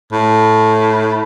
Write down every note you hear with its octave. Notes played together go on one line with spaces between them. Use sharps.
A2